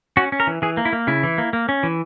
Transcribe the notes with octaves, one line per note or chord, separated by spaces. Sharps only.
C#4 F#4
C#4
A#4
E3
E3 G#4
A#3
E4
A#3
C#3 E4
E3
A#3
A#3
C#4
E3